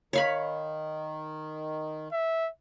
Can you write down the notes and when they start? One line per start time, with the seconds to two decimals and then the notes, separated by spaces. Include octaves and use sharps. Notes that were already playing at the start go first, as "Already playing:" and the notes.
0.13 D#3 C#5 F5 B5
2.12 E5